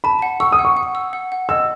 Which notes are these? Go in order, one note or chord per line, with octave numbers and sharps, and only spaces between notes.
A5 B5
F#5
C#6 E6
D#6
F#5
C#6
F#5
E6
F#5
F#5
D#5 E6